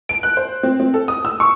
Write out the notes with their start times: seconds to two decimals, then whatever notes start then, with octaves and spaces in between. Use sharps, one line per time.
0.09 D7
0.23 F#6
0.37 C5
0.63 C4
0.80 C4
0.94 A4
1.08 D#6
1.25 E6
1.40 C#6